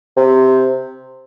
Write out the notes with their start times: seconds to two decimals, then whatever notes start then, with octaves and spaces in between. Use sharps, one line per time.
0.17 C3